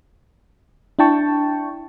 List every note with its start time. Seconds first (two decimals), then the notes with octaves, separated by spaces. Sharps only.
0.99 D4 E4 G5 A5 C#6